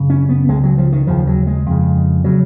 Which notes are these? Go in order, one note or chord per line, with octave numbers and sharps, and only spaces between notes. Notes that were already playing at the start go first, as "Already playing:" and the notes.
Already playing: F#2 C#3
C#4
B3
C#2 C#3 G#3
F#3
F3
D#3
D#2 C#3 F3
F#3
G#3
F2 C#3
C#3 F#3